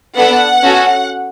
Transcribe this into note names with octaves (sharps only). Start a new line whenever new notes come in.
B3 D4 A4 F#5
C#4 F#4 A4